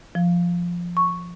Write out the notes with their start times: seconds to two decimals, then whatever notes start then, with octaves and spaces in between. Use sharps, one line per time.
0.15 F3
0.97 C#6